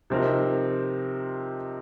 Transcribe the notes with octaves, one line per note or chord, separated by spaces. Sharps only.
C3 F3 C4 D#4 A#4